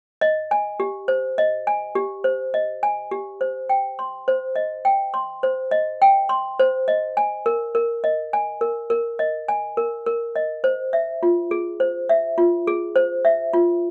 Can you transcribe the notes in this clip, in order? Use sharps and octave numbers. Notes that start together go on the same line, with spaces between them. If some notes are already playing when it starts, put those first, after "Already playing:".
D#5
G#5
G4
C5
D#5
G#5
G4
C5
D#5
G#5
G4
C5
G5
C6
C5
D#5
G5
C6
C5
D#5
G5
C6
C5
D#5
G#5
A#4
A#4
D#5
G#5
A#4
A#4
D#5
G#5
A#4
A#4
D#5
C5
E5
F4
G#4
C5
E5
F4
G#4
C5
E5
F4